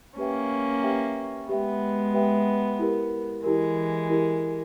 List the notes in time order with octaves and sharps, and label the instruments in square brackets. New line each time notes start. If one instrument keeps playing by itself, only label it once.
[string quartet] A#3 C#4 [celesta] G4 B4 E5 G5
[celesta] G4 B4 E5 G5
[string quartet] G#3 B3 [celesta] G4 B4 E5 G5
[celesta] G4 B4 E5 G5
E4 G4 A#4
[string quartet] E3 G#3 [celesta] E4 G4 A#4
[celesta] E4 G4 A#4